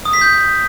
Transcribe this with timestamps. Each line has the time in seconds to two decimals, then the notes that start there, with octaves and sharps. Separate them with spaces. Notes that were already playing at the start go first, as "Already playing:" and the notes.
0.05 D#6
0.13 B6
0.21 G6